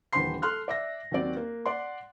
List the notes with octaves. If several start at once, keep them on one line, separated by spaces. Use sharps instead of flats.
D#1 D3 E3 C5 C6 C7
A4 C6 F6 F#6
D5 E5 A#6
D#2 F#3 C4 D5
A#3
D5 F#5 C6